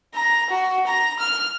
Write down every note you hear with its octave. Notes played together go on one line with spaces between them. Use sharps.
A#5
F#4
A#5
F6